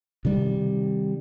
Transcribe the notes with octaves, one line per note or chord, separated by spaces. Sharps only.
C3 D#3 G3